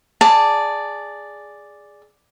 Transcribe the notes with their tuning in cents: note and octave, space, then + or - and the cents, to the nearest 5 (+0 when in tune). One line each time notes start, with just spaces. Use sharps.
G#4 -5 D5 +0 A5 +15